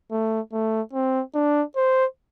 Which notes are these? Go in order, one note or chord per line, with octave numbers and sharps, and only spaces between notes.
A3
A3
C4
D4
C5